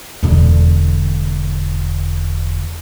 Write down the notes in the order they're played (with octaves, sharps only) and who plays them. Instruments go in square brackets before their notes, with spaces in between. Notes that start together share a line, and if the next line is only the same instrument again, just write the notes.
[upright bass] E1 D3